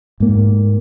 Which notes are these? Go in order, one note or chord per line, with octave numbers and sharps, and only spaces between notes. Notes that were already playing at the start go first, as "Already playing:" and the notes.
G#2 A#3